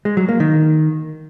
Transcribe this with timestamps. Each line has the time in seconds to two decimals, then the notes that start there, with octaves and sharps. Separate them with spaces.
0.05 G#3
0.17 F#3
0.28 A#3
0.40 D#3